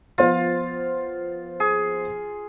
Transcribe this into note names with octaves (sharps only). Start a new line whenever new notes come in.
F3 B3 F4 C5
G#4